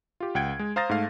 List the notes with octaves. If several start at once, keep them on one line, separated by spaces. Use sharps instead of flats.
F4 G4
C#2 F#5 G5 G#6 D7
G#3
C5 F5 A#5 D#6 A6 A#6
G#2 A3 F5